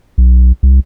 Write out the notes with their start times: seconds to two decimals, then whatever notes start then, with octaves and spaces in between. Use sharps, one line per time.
0.18 B1
0.63 C2